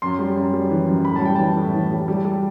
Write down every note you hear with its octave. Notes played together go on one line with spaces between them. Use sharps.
F#2 C6
G3
F#2
G3
E3
F#2
A2 B5
A5
G3 G5
E3 A5
A2
E3
G3
G3
G3